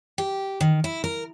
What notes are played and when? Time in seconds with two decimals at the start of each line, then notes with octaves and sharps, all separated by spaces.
0.18 G4
0.61 D#3
0.84 E4
1.04 A#4